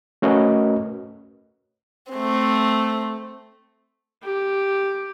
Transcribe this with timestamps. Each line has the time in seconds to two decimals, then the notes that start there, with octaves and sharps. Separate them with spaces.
0.22 A3 C#4 F#4 A#4 B4 D#5
2.12 A3 C4
4.23 G4